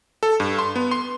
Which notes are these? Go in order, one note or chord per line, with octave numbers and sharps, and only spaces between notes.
A4
G2
C6
B3
C6